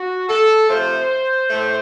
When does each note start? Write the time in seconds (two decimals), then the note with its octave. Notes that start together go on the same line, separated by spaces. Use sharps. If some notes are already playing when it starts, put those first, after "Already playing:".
Already playing: F#4
0.29 A4
0.69 C3 F3 A3 C5
1.50 A2 A3